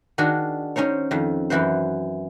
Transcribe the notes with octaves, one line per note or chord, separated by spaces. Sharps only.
D#3 D4 F#4 G#4
C#4 D#4 C5 C#5
F2 D#3
F#2 E3 F#4 C5